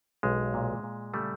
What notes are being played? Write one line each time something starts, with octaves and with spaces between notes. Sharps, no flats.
B1 G#3
A#2
A#2
C#3 G3 A3